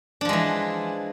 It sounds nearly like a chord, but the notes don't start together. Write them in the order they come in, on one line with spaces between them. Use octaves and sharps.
D4 F3 G#3 E3